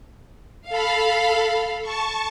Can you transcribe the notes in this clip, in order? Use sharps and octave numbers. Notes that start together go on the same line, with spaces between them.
A4 F5 B5
A5 C#6